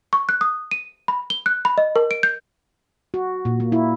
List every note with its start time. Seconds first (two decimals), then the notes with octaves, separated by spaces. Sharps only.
0.13 C#6
0.29 F#6
0.41 D#6
0.71 D#7
1.08 B5
1.30 G7
1.46 F#6
1.65 B5
1.78 D#5
1.96 A#4
2.11 D7
2.23 G6
3.14 F#4
3.45 A#2
3.60 A#3
3.72 E4